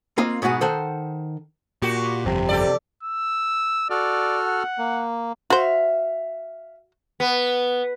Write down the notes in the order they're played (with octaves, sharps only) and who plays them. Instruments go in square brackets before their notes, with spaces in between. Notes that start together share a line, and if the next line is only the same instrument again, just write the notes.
[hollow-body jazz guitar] A#3 C4 F4 D#5 F5
G#2 B2 B3 F#4 G#4
D#3 A4 C5 F#5
[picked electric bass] A#2 [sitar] F#4 G4
[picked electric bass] G1 F2 [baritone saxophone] C3
[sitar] G4 A4 D5
[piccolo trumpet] E6
[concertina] F#4 A4 F6 [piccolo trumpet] D5
[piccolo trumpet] F#5
[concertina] A#3
[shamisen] F#4 C5 [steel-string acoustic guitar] E5 F5
[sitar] B3